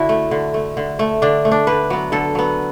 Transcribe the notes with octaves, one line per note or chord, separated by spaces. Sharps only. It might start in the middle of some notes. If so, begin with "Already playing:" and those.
Already playing: D3 E4 F#4 A4
A3
D3
A3
D3
A3
D3 D4
A3
D4
D3 B4
F#3 B3
D3 A4
F#3 B3